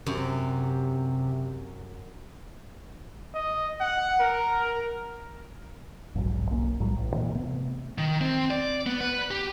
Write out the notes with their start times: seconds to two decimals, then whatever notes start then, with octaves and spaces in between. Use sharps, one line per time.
0.06 F#2 C3
3.34 D#5
3.81 F#5
4.20 A#4
6.15 F1 B1 G#2 F#3
6.50 B1 A#3 C#4
6.80 B1 A2 F#3 G3
6.96 A1
7.13 A#2 E3
7.35 C3 A3 B3
7.98 D#3
8.21 C4
8.51 D5
8.86 B3
9.01 B4
9.31 G4